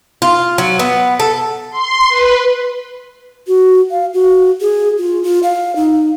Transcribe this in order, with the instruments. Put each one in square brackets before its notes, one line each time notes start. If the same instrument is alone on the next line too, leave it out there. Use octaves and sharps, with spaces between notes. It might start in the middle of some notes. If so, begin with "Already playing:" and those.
[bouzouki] F4
F#3
B3
A4
[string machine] C6
B4
[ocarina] F#4
F5
F#4
G#4
F4
F4
F5
D#4